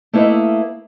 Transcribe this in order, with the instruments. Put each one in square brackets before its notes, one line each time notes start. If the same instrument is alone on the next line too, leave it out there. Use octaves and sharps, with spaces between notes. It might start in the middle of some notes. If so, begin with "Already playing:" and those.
[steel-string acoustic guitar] A3 A#3 E4 B4 D#5